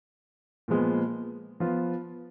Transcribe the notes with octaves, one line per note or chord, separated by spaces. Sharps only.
A#2 F3 G#3 B3
F3 B3 F4